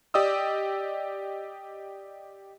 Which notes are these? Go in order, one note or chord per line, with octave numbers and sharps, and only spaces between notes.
G4 D5 D#5 D#6 E6